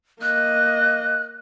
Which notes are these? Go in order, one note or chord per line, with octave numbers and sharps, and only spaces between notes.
A#3 D#5 F#6